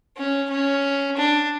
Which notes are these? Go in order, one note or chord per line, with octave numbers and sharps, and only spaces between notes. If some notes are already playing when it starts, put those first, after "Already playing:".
C#4
C#4
D4